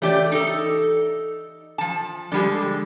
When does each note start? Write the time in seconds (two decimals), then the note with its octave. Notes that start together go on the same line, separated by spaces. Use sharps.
0.02 E3 A3 G4 D5
0.32 D#4 A4
1.78 F3 A5
2.32 D3 F3 G3 G#3 G4